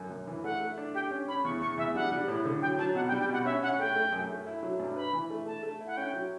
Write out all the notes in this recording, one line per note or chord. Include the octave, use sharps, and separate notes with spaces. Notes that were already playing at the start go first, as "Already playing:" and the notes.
Already playing: F#2 D3
F#2
E3
A3 F#5
A3
D4
G4 G5
C#4
C#4 B5
E2 C#6
E2 C#6
E2 E5
G3 F#5
G3
A2
D3
F#3 G5
F#3 A5
B2 F#5
G5
G3
G5
B2 F#5
C#4 E5
C#4 F#5
A3 G5
A3
F#2
A3
E4
F#3
G2
B4 B5
E3
A3
A3 A5
A3
E4
F#5
C#4 G5
F#3